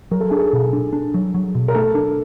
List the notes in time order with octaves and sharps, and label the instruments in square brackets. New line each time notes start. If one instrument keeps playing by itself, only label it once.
[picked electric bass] F#3 [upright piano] A#4
[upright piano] A4
[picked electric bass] D4 [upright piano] G#4
[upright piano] A4
[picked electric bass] B2
D4
D4
F#3
F#3
B2
[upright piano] A#4
[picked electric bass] A3 [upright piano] A4
[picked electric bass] D4